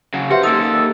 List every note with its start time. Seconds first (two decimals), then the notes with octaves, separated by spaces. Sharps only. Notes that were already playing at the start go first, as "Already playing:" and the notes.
0.14 C#3 F#3
0.30 G4 B4 C5 E5 F#5
0.43 A#3 D#4 A4 D#6